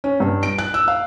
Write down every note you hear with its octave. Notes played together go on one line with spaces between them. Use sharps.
C#4
G2
D7
F#6
E6
F5